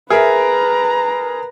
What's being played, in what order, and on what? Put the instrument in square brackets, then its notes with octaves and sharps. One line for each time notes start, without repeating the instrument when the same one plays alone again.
[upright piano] G#4 A#4 E5 [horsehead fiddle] B4 A#5